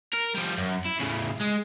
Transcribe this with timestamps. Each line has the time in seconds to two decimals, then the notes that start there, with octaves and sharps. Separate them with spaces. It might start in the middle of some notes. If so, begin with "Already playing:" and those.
0.13 A#4
0.34 F3 G3
0.58 F#2
0.86 E4
1.01 A2 C#3
1.41 G#3